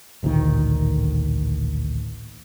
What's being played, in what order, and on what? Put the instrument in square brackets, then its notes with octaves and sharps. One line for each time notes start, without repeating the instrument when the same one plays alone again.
[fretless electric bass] A1 D2 A#2 D#3